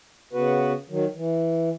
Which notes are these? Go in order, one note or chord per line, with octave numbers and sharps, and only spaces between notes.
C#3 B3 F#4 B4
D#3 F#3
E3